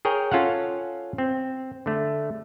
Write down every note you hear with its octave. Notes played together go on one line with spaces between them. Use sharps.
G#4 A#4 C#5 G5
C#4 F4 A4 F5 F#5
C4
D3 A3